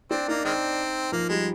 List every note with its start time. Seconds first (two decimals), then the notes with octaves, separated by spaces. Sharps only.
0.11 C4 D4
0.28 A#3 D#4
0.45 D#3 G#3 C4
1.12 F3 A#3
1.29 G3 G#3